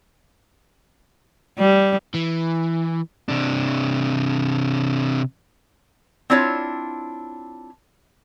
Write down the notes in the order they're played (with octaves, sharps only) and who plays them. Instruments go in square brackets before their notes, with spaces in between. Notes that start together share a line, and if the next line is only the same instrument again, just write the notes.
[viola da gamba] G3
[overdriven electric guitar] E3
[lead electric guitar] C3 D4
[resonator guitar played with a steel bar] C4 D4 E4 F4 C#5